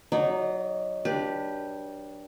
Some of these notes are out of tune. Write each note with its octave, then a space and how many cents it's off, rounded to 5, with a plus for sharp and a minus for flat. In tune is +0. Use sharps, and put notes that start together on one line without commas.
F#3 +0 D#4 -10 D5 -40
D4 +0 G4 +0 B4 -35